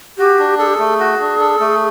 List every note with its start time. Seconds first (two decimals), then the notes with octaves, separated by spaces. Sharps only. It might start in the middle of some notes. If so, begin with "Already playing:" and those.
0.18 F#4 G4
0.39 D4
0.59 G#4 A4
0.66 G4
0.74 G#4
0.79 A3
1.00 F#4
1.20 D4
1.40 A4
1.60 A3